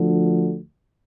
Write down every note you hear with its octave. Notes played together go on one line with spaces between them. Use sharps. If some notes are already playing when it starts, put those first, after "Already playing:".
Already playing: D2 D3 F3